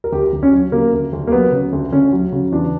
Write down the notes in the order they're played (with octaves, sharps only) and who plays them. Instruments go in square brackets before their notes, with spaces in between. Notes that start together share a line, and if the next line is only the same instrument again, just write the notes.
[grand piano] A#4
D2 G4
D2
C#4
F#3
C#3 A#3
D2
D2
A#3
F#3 B3
C#3
D2
D2 C#4
F#3
C#3
E2 D4